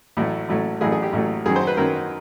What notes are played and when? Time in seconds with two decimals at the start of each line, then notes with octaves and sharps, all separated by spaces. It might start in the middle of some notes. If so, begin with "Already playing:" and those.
0.17 A1 A2 F#3 A3
0.49 A1 A2 F#3 A3
0.81 A1 A2 F#3 A3 G#4
0.92 G#4
1.02 G4
1.13 A1 A2 F#3 A3
1.46 F#2 D#3 F#3 G#4
1.56 C5
1.67 B4
1.77 F#2 D#3 F#3 A#4